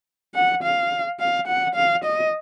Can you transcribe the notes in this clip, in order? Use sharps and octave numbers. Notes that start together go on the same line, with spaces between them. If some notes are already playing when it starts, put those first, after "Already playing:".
F#5
F5
F5
F#5
F5
D#5